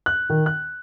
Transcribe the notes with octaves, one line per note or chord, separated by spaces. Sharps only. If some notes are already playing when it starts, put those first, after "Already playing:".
F#6
D#3
F#6